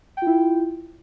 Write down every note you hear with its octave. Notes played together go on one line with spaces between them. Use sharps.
E4 F4 G5